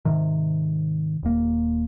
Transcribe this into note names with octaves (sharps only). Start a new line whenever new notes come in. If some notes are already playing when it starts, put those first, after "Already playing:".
G#2 C3 D#3
D#1 A#3